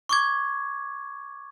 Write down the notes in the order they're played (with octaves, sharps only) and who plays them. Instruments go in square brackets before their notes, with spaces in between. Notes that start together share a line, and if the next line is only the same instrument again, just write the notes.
[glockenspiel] C#6 D6 G#6